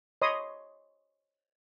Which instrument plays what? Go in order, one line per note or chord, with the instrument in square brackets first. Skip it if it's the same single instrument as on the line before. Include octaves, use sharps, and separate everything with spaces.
[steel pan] C#5 D#5 B5 C6 D#6